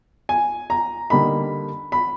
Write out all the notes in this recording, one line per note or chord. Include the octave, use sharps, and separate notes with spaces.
G#5
A#5
D3 G3 A#3 D#4 B5
B5